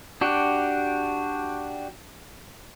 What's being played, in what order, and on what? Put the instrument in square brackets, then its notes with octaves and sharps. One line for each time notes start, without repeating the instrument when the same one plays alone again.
[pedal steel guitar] D4 F#4 G4